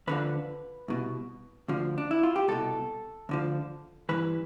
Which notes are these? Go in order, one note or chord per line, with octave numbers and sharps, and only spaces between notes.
D2 D3 F3 B4
C2 B2
D2 D3 F3
D4
E4
F4
G4
C2 B2 A4
D2 D3 F3
G2 E3 B4